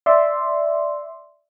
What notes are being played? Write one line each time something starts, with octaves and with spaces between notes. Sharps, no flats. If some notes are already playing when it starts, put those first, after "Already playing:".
D5 E5 C6